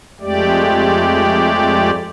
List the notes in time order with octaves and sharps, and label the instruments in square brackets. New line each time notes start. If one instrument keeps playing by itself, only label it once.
[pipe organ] F2 G#3 A3 G4 D5